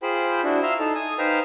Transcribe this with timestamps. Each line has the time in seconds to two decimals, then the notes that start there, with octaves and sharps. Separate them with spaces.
0.02 F4 G#4 C5 G5 B5
0.44 D4 E4 F#4
0.63 E5 F5 A#5 C6 E6
0.79 D#4 A4
0.95 G#5 D#6
1.19 D#4 B4 C5 F5 G5 A#5